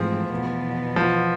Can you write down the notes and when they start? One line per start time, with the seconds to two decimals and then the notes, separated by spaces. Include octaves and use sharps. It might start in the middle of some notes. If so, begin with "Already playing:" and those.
Already playing: G#2 E3 F3 A3 C4 G#4
0.30 E2 B2 B3
0.96 F3